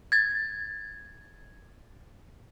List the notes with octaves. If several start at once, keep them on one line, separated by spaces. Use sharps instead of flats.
G#6 A6